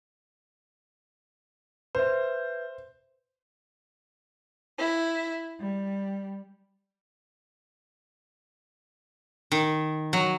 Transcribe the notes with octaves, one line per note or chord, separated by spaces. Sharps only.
B4 C5 E5
E4
G3
D#3
F#3